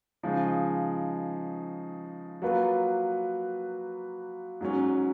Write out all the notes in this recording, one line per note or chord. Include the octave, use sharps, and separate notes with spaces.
C#3 F3 G#3 D#4
F#3 A#3 F4 B4
G#2 F#3 C#4